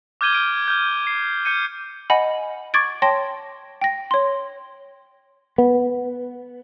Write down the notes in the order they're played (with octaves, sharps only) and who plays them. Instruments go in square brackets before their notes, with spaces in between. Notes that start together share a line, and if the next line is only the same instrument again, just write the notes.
[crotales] D6 F6 G6 G#6 D#7 G7
F6 D7 D#7
F6 G6
C7
F6 G6 C#7 D#7
[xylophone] D#5 F#5 G#5 B5
C#6 D6 G#6 A6 D7
C#5 G5 A5 C6 A#6
G5 A#6
C#5 C6
[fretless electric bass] B3